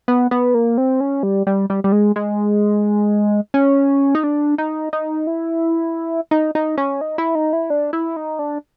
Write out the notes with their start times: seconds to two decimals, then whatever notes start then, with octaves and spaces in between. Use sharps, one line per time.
0.08 B3
0.31 B3
0.54 A#3
0.78 C4
1.00 C#4
1.23 G3
1.47 G3
1.70 G3
1.84 G3
1.92 G#3
2.16 G#3
3.54 C#4
4.15 D#4
4.24 D4
4.58 D#4
4.93 D#4
5.27 E4
6.31 D#4
6.55 D#4
6.77 C#4
7.01 D#4
7.18 E4
7.35 D#4
7.53 E4
7.70 D4
7.93 E4
8.16 D#4
8.39 D4